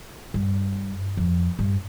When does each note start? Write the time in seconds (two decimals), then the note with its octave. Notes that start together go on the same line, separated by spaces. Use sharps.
0.34 G2
1.17 F2
1.59 G2